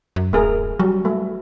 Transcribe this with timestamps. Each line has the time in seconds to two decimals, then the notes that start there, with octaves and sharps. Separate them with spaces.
0.16 F#2
0.33 D1 A3 G#4 A#4
0.80 F#3 G3
1.05 A3